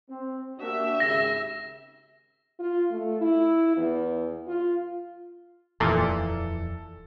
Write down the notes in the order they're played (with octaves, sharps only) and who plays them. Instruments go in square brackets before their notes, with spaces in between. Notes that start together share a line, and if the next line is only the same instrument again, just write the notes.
[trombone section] C4
[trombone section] A#3 D4 F#4 [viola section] G4 E5
[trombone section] G#1 C#3 [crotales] A#6
[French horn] F4
A3
E4
E2
F4
[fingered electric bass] D#1 F2 [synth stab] A#2 [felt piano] E3 [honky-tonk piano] A4